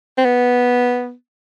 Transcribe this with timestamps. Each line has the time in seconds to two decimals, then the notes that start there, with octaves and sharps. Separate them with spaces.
0.18 C4
0.25 B3